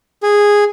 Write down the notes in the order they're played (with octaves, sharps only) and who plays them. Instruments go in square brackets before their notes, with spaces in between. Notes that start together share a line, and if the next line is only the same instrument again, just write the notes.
[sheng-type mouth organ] G#4